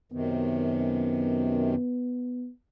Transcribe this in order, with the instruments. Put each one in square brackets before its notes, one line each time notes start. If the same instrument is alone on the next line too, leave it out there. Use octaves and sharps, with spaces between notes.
[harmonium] F#2 C3 D#3 [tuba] B3